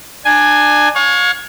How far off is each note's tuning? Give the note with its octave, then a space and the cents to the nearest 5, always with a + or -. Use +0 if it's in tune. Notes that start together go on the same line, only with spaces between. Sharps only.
D4 +25 G#5 +0
C#5 +5 F5 +40